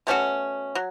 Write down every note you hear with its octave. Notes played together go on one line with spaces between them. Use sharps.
B2 A3 C#4 F#4
F#3